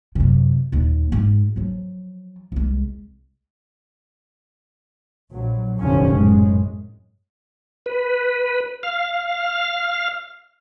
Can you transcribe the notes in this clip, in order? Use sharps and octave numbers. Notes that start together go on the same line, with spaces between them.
F#2 C3
D#1 D#2
G#2
F3 F#3
C2 G#3
A#1 F#3
F1 A#1 E2 D3 F3 C#4
F#2 A2 G#3
B4
F5